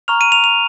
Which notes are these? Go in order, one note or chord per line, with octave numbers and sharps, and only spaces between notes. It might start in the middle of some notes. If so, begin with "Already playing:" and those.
A#5 C#6 F6 F7
D#7
F7
F7